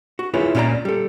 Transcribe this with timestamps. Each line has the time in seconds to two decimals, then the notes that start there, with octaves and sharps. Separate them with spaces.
0.19 F#4
0.34 E4 F4 G#4 B4 C#5
0.55 A#2 C#4 F4 G4 D5 A#5
0.85 G3 A4